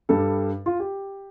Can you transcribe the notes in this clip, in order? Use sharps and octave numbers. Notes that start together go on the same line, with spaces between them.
G2 G3 A4
F4
G4